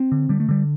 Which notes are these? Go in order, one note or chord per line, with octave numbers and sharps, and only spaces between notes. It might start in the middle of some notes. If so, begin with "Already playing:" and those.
Already playing: C4
D3
D3 G3
A3
D3 G3